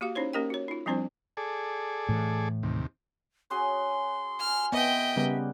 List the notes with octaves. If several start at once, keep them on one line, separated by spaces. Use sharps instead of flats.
A#3 F#4 G4 F5
C#4 D#4 E4 C5 C#5
A#3 C#4 G4 A#4 D#5 G5
F#4 C#5
D#4 F4
F3 G3 C4 D4 E4 C5
G#4 A4 D5
A2 E3
D#2 C3
C#4 F#4 G#4 C6
G#5 F6
B3 C4 D#5 E5 G5
C#3 G3 A#3 B3